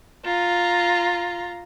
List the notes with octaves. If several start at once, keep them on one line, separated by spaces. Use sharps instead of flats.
F4 A#5